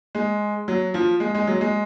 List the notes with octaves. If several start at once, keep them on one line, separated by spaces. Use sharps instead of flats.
G#3
F#3
F3
G#3
G#3
F#3
G#3